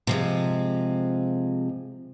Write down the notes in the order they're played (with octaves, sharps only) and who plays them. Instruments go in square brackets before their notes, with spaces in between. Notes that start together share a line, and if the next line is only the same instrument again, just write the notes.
[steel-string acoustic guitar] C3 F3 G#3